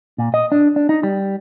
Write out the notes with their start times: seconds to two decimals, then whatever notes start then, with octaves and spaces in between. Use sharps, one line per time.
0.18 A#2
0.34 D#5
0.52 D4
0.76 D4
0.89 D#4
1.03 G3